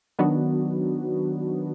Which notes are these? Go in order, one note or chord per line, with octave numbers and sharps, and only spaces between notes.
D#3 F#3 B3 D4 F#4